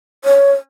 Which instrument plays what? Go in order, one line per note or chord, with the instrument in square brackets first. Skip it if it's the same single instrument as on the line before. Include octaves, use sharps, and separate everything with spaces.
[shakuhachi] C#5